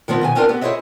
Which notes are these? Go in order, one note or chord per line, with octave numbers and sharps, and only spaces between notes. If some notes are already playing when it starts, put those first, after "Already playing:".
D#3 F3 B3 C4
B2 D#3 G#5
B3 C4 D4 F4 A#4 B4
B3 C4 G4
E4 G#4 C5 C#5 D#5 E5